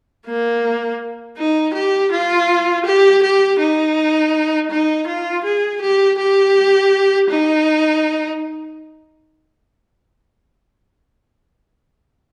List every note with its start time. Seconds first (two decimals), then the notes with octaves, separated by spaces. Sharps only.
0.26 A#3
1.37 D#4
1.74 G4
2.11 F4
2.85 G4
3.22 G4
3.59 D#4
4.70 D#4
5.07 F4
5.44 G#4
5.81 G4
6.18 G4
7.29 D#4